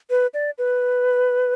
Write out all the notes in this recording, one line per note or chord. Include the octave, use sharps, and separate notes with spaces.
B4
D5
B4